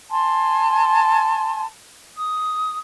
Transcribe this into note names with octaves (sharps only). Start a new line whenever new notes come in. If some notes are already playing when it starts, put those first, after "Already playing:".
G#5 A5 C6
D#6